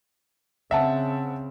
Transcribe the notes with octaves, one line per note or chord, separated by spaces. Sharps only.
C#3 C4 E5 F#5 A5